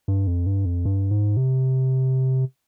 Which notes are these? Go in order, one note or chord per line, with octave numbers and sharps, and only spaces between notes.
G2
F2
G2
F2
G2
G#2
C3